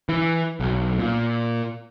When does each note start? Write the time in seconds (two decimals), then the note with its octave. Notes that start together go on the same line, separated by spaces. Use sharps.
0.09 E3
0.60 B1
0.99 A#2